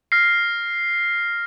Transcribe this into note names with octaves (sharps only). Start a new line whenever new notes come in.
F6 A#6 C7